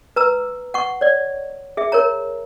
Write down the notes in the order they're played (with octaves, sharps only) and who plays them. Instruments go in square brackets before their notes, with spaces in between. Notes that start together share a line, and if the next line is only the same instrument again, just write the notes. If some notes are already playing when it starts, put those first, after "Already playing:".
[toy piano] B4 A#5 E6
F#5 C#6
C#5 D5
G#4 E5
A#4 C#5 A#5